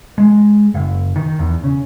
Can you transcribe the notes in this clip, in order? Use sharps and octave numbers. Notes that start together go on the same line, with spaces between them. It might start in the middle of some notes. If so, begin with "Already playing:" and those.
G#3
F#1
D#3
E2
C#3